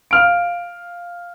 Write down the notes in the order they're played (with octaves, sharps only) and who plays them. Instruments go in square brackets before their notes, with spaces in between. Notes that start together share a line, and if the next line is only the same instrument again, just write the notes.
[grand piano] F5 F6 D7